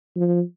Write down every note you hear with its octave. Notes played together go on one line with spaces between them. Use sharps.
F3